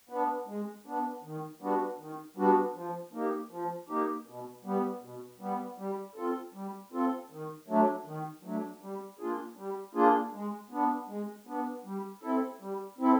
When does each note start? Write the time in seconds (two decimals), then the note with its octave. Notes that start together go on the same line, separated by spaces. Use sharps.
0.09 B3 D4
0.48 G#3
0.86 B3 D4
1.23 D#3
1.61 G3 B3 D4 F#4
1.98 D#3
2.37 G3 B3 D4 F#4
2.75 F3
3.13 A#3 D#4 G4
3.51 F3
3.89 A#3 D#4 G4
4.26 B2
4.64 G3 B3
5.02 B2
5.40 G3 B3
5.78 G3
6.16 C4 F4 A4
6.54 G3
6.92 C4 F4 A4
7.30 D#3
7.68 F#3 A3 D4
8.05 D#3
8.43 F#3 A3 D4
8.81 G3
9.19 A#3 D4 F4 G#4
9.57 G3
9.94 A#3 D4 F4 G#4
10.33 G#3
10.70 B3 D4
11.09 G#3
11.47 B3 D4
11.85 G3
12.22 C4 E4 A4
12.60 G3
12.98 C4 E4 A4